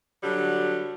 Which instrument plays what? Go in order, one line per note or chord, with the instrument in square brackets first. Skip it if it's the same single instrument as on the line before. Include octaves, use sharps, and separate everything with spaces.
[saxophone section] D3 F#3 G3